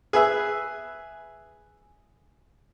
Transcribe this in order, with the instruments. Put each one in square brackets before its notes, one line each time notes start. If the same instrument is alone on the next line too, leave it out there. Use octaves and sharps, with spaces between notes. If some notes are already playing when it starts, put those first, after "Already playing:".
[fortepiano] G#4 B4 E5